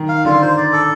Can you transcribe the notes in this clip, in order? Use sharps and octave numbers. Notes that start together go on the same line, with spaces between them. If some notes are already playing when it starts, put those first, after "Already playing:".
Already playing: D#3
F5
D3 F4
C5
D5
A4